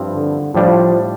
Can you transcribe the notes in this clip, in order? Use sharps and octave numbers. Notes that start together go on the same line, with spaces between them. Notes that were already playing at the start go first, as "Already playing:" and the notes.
Already playing: G2 F3 C4 E4
D3
A2 F3 G3 D4